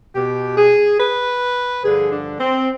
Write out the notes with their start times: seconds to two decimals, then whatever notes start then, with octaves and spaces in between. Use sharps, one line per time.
0.14 B2 G4
0.56 G#4
0.99 B4
1.82 G2 D3 F3 G#4
2.10 D4
2.38 C4